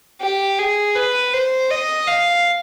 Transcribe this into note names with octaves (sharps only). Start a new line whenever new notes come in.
G4
G#4
B4
C5
D#5
F5